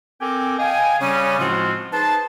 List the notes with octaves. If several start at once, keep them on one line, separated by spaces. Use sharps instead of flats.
C4 A4 A#4 G5 G#5 D6
D#5 F5 G5 G#5
C#3 G3 C#4
A2 F3 G#3 C4 F4 F#4
D#4 G#4 B4 C5 A5